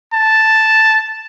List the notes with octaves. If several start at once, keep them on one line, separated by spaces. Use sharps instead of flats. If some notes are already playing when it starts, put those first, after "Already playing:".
A5